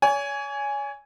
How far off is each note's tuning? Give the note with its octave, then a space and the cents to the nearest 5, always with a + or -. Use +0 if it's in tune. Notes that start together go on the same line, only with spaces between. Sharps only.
C#5 +40 G#5 +0